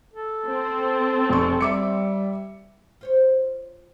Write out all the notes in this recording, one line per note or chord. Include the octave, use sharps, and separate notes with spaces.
A4
C4
F1 C#6
G3 E5 D6 C#7
F4 C5 C#5